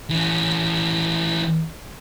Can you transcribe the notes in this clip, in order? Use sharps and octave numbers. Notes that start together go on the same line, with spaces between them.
E3 C#4